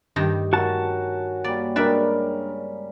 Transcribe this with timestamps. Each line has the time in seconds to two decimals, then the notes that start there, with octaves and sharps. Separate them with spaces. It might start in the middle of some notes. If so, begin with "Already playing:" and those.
0.16 G2 D#3 A3
0.53 C#4 F#4 A#4 G5 A5
1.44 G3 A#3 D5
1.76 C#3 G3 G#3 D4 A#4 B4 D5 E5